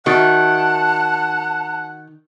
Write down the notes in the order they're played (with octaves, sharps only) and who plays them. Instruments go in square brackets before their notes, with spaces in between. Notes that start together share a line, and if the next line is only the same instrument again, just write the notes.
[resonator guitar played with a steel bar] D#3 [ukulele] F#4 D5 E5 [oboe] F#5 [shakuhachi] A5